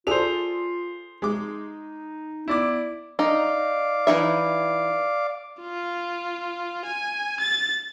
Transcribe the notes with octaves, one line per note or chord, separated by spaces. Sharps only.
F4 G#4 A4 C5 D5 F7
G#3 D#4 D6
B3 E4 D5 D6
D#4 D5 F5 D6
E3 D#4 E5
F4
G#5
A6